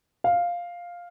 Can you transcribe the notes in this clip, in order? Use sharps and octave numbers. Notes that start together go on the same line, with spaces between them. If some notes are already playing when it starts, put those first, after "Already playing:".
F5